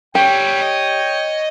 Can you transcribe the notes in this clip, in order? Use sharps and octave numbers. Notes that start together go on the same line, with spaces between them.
D3 G3 G4 C#5 G5
D#5